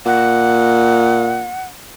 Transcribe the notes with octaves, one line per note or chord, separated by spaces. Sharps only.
A#2 F#5